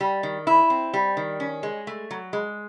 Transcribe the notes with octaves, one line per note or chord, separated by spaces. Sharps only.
G3
D#3
E4
C4
G3
D#3
C#4
G#3
A3
F#3
G#3